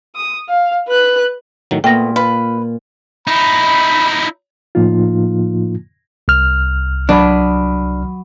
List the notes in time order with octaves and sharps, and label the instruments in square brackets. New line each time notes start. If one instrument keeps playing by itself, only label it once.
[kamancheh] D#6
F5
B4 F#6
[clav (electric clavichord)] A2 D#3 F#3
[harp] A#2 [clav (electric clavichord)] A3 B3 [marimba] G5 A#6
[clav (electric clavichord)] F4 [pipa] B4
[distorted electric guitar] D#4 E4 [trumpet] B5
[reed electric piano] A2 F3 A#3 D#4 F4
[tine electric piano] C2 F6
[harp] F#3 D#5 B5 [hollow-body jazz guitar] D4